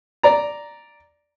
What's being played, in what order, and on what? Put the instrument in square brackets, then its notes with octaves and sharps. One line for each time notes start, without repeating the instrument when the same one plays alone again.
[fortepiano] D5 A#5